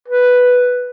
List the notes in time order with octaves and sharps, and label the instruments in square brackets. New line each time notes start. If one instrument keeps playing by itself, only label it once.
[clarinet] B4